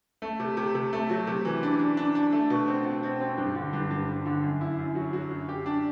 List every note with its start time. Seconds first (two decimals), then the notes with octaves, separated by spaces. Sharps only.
0.22 A3
0.40 C3
0.57 C3
0.75 C3
0.93 A3
1.10 F#3
1.27 C3
1.45 E3
1.63 D4
1.79 D4
1.97 D4
2.15 D4
2.33 A3
2.50 B2
2.68 C4
2.85 B2
3.03 C4
3.21 C4
3.38 G2
3.55 D3
3.73 G2
3.91 G2
4.08 G2
4.26 D3
4.43 F#2
4.61 E4
4.79 F#2
4.95 F#3
5.13 F#3
5.31 F#2
5.49 G4
5.66 D4